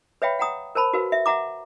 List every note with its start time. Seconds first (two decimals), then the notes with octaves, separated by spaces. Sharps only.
0.22 B4 C#5 E5 F5 G5 B5
0.39 F#5 G5 A#5 D#6
0.75 A#4 C5 A5 B5
0.93 F#4 A#4 B4 F5
1.12 E5
1.26 E5 F#5 A#5 D6